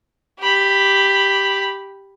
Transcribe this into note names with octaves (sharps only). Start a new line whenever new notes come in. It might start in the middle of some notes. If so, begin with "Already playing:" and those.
G4 B5